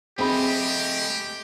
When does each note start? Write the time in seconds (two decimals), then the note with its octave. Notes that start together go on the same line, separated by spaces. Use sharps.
0.19 A3 C4 G4 G#4 D#5 B5